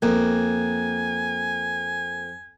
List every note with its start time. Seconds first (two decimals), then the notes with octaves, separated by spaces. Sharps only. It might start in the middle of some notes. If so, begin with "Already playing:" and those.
0.02 F2 A#3 G#5